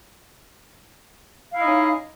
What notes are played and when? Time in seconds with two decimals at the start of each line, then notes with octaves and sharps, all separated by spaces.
1.52 F5
1.56 E4
1.59 D#5
1.63 D#4
1.67 C#4